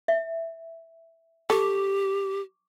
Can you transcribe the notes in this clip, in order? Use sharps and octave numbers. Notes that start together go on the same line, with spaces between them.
E5
G4 A4 C#6 D6